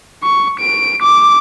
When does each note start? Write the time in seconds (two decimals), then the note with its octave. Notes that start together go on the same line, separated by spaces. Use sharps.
0.23 C#6
0.59 D7
1.02 D6